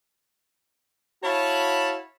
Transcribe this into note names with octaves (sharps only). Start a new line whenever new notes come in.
E4 F#4 C#5 F5 A5 B5